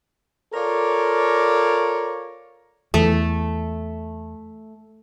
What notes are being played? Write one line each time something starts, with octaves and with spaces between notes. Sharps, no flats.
F4 A4 A#4 C#5 D5
E2 A3